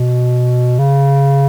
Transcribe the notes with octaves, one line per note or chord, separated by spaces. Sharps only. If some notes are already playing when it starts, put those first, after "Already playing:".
Already playing: B2
C#3